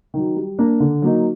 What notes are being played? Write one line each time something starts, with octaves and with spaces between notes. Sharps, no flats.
D#3 F#3
G3
A#3 D4
D3
F#3 A#3 D#4